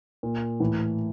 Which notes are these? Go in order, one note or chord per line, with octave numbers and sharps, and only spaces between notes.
A#2
A2 E3